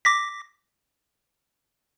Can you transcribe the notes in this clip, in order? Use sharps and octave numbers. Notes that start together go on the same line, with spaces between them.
D6 A#6 B6